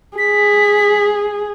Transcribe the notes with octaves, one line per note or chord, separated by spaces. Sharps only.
G#4 B6